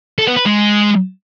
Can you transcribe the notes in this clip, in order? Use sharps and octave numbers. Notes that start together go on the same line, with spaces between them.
A4
B3
B4
G#3